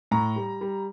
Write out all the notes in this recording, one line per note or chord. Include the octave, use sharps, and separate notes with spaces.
A2 A#5
G3
G3